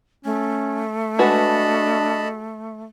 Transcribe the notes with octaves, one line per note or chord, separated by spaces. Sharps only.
A3 C#4
G#3 D4 F#4 B4 D#5 A5 B5